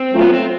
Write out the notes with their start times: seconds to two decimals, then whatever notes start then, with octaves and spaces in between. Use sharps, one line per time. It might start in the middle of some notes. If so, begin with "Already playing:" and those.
Already playing: C4
0.12 F#3 A3 C#4 F4
0.21 B3
0.34 C4